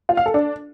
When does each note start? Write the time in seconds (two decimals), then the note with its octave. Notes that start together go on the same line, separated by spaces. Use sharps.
0.09 F4
0.17 F5
0.26 A4
0.34 D4